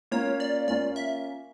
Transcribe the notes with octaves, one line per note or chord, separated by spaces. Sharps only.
A#3 C#4 F4 C#5
D5
A#3 C#4 F4 D5
E5